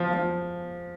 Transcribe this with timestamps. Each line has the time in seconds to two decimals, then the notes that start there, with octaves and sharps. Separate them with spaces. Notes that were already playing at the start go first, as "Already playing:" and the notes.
Already playing: F3
0.14 F3